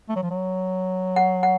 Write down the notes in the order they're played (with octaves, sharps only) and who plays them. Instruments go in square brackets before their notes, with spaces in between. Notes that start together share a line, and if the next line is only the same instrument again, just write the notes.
[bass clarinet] A3
F#3
F3
F#3
[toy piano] F#5
F#5